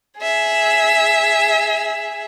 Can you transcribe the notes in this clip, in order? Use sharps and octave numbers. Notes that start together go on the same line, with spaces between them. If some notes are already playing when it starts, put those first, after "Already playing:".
G#4 E5